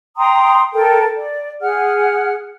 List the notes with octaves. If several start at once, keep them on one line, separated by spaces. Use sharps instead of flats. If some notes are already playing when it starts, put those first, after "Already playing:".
G5 A#5 C6 D#6
A4 A#4 G5
D5
G#4 F#5 F6